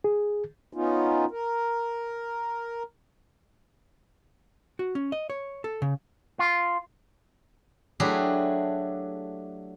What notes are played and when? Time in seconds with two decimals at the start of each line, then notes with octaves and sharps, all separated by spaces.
0.04 G#4
0.73 B3 C#4 D#4 F4
1.31 A#4
4.79 F#4
4.95 C#4
5.12 D#5
5.30 C#5
5.64 A4
5.82 C#3
6.39 F4
8.00 F#3 A3 D4 E4 G4 G#4